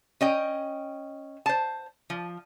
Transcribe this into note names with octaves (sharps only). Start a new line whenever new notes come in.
C#4 D#5 G5
C5 A5
F3